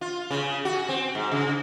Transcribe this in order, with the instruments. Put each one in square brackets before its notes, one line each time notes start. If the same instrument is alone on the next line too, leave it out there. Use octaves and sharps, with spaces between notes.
[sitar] F4
C#3
F#4
C4
G#2
C#3